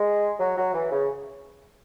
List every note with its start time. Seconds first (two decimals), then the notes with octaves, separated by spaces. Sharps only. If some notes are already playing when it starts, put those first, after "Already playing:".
Already playing: G#3
0.40 F#3
0.57 F#3
0.74 E3
0.92 C#3